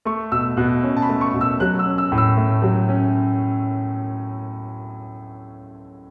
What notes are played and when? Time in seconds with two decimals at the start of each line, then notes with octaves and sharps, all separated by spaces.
0.05 A3 C#6
0.32 B2 E6
0.57 B2 F#6
0.83 C#4
0.96 A5
1.02 B5
1.09 A3
1.21 C#6
1.34 B2
1.41 E6
1.60 F#3 F#6
1.79 E6
1.85 C#4
1.98 E6
2.12 A2
2.18 E6
2.37 A3
2.62 F#3
2.89 C#4